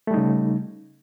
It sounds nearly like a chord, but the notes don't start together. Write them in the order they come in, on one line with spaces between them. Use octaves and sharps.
A3 G3 D#4 C#3